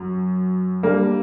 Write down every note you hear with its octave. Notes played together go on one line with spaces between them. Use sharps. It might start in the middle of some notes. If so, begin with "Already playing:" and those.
Already playing: F#2
G3 A#3 D4